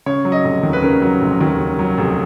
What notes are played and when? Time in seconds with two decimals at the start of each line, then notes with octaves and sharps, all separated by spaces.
0.06 C#3 C#5
0.25 F#3
0.32 D#5
0.44 F1
0.63 D#2
0.73 B4
0.82 C#3 A#4
1.02 F#3
1.22 F1
1.41 D#2
1.59 C#3
1.79 F#3
1.98 F1